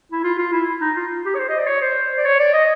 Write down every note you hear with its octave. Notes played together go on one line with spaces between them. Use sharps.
E4
F4
F4
E4
D#4
F4
G4
C#5
C5
D#5
D5
C#5
C5
D5
C#5
D5
D#5